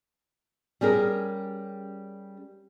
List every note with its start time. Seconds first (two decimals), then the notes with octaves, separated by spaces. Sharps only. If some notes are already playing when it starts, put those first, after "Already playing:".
0.81 G3 C#4 G#4 A#4